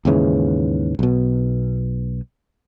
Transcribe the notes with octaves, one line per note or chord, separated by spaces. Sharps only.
D#2 G#2 C#3 E3
B1 B2